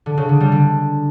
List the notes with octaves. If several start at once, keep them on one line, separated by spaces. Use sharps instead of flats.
D3
C#3
D3
G3
D3